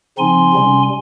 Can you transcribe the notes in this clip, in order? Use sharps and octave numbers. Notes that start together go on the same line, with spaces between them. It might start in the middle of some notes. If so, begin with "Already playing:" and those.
C#3 F3 C4 D#4 G#5 C6
C3 G3 C#4